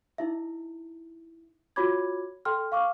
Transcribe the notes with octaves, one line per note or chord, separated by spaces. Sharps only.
D#4 E4 E5
F4 F#4 C#5 B5 D6 G#6
A4 G5 C6 F6
F5 C#6 D6 F6